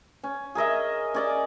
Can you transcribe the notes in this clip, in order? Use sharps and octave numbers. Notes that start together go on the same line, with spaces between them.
C#4
G#4 A#4 D#5 E5
C#4 D5 D#5